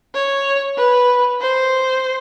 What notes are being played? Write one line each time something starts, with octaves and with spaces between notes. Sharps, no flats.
C#5
B4
C5